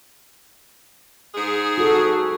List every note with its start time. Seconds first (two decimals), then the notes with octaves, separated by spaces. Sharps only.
1.34 G#2 G#4
1.78 F#4 A4